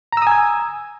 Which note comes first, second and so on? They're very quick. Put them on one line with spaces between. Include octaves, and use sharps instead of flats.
A#5 E6 D#6 G#5 G#6